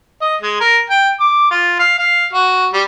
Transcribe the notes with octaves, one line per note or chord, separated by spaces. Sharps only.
D#5
G#3
A#4
G5
D6
F4
F5
F5
F#4
G3